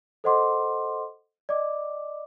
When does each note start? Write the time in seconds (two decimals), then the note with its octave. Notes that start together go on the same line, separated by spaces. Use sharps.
0.24 A4 C5 D#5 F#5 C6 D6
1.49 D5 D#5 D6